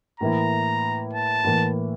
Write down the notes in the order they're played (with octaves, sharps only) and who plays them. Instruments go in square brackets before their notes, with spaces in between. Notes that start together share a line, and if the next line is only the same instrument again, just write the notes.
[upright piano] A2 E3 A#3 E4 [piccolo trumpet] A#5
[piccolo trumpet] A5
[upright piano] A2 E3 A#3